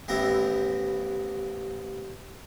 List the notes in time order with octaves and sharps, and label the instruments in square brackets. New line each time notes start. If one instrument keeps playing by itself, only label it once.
[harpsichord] A1 D#2 B3 C4 E4 A#5